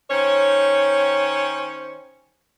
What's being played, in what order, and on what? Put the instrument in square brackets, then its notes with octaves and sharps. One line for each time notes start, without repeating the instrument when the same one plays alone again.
[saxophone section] D#3 C#4 C5 C#5